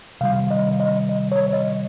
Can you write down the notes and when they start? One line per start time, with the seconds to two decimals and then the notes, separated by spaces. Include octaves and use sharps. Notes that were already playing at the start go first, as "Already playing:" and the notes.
0.21 C3 D#3 G3 F5
0.51 D#5
0.80 D#5
1.09 D#5
1.32 C#5
1.53 D#5